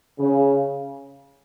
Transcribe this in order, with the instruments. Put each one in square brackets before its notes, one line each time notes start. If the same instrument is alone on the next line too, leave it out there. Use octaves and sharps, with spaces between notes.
[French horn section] C#3